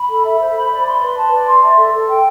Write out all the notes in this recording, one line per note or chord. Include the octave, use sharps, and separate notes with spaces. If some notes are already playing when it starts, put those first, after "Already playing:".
Already playing: B5
A4
E5
C5
B5
D5
C6
B4
A5
D5
C6
E5
A4
A4
G5